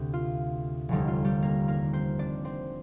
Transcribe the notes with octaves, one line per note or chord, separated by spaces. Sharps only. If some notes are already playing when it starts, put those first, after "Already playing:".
Already playing: D2 C3 G4
F4
F1 D#2 D3 G3 D#4
F4
G3 G4
A#3 A#4
A#3 A#4
C4 C5
D4 D5
C4 C5